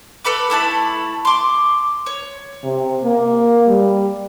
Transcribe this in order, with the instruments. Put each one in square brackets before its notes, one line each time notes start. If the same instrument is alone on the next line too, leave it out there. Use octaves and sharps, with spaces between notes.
[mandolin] A4 B4 B5 D6
A3 E4 A5 B5
C6 D6
C#5
[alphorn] C3
A#3
G3